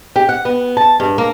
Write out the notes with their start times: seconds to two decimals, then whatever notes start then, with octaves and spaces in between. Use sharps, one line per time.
0.16 G4
0.29 F#5
0.45 B3
0.77 A5
1.00 G2
1.18 A#3